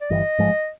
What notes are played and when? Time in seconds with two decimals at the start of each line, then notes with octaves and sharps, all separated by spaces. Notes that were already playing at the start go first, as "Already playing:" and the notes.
0.01 D5
0.10 G1 G2 E3 G3 D#5
0.38 A1 G#2 F3 G#3